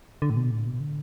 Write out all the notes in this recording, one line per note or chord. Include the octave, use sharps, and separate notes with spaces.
D3
A2
B2
A2
B2
D3